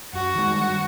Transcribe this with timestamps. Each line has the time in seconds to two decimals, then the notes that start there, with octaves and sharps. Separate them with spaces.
0.13 F#2 F#4
0.35 D#3 G#3
0.56 G2